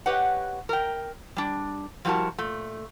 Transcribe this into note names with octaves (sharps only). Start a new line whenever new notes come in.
G4 B4 C#5 D#5 F#5
A#4 E5 G5
G3 D4
F3 G3 E4 F#4 A#4 A5
A#2 A3